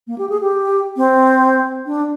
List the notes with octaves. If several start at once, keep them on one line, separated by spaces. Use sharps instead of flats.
A#3
G4
G#4
G4
C4
D4